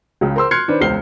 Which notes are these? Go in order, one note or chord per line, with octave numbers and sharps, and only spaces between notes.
C#2 C#3
A#4 C5 C6 E6
C6 F6 F#6 G#6 C7 C#7
D#3 D4 B4 C5
E1 C#2 C5 F6 C7 G7